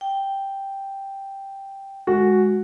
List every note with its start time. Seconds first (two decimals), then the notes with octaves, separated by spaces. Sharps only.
0.01 G5
2.07 G#3 F#4